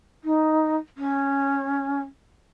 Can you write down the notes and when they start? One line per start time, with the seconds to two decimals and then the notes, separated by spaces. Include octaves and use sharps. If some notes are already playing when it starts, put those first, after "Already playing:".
0.23 D#4
0.97 C#4